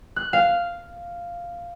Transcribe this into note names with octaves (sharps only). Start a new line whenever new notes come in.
F#6
F5